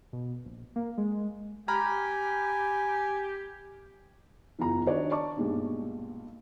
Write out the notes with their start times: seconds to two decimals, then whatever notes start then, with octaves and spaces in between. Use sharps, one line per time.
0.13 B2
0.45 A#1
0.76 A#3
0.98 G#3
1.68 G4 G#5 A#5 B5 F6
4.59 F#1 E2 F4 A#5
4.86 D#3 D4 D#4 F#4 C#5 D5
5.11 D5 A5 C#6 D6
5.37 B1 G2 A#2 G#3